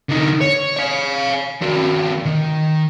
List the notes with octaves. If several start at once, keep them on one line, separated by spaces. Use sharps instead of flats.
D3 D#4
C#5
C#5 F5
D#3 F#4
D#3